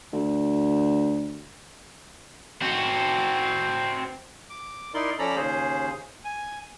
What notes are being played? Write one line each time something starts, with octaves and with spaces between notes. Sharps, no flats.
D2
C4 F#4
D6
D#4 E4 A#4 D5 C6
F3 C#4 A4 D5 A#5 B5
D#2 C#3 C#4 G#4 C5
G#5